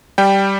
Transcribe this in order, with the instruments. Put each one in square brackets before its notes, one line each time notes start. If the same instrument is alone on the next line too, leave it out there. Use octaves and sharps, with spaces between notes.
[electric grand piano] G3 G5